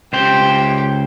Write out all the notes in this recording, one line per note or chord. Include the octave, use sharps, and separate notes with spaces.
C#2 G4 C5 G5